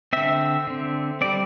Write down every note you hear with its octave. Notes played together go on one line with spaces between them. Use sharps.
D3 C4 E5
D3 C4
G3 C4 D5